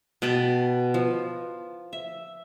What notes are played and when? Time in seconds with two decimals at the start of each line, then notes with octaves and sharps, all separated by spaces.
0.22 B2 B4 G5 A5
0.94 F3
1.93 E5